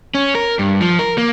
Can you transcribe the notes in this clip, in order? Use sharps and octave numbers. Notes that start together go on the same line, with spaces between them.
C#4
A#4
G2
F3
A#4
A#3